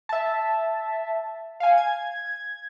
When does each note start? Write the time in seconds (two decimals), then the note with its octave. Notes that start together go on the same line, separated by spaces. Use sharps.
0.09 E5 A5
1.60 F5 G#5
1.78 G#6